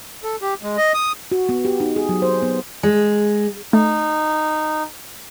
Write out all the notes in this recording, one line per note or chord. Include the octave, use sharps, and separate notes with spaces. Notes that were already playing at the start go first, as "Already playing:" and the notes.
A4
G4
G#3
D#5
D#6
F#4
B3
G4
D#4
G#4
F#3
C5
B3
G#3
A3 D#4